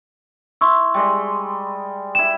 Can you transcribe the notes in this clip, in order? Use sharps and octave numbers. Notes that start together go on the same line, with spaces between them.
E4 C6 C#6 E6
G3 G#3 D#5
E4 G4 E7